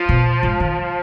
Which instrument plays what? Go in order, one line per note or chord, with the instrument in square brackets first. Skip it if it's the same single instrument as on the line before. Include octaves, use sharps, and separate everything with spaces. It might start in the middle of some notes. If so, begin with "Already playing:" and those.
Already playing: [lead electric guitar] F3
[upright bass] B2
G#2
D#3